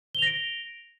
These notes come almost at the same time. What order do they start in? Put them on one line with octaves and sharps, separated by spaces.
G7 F7 A#6 D7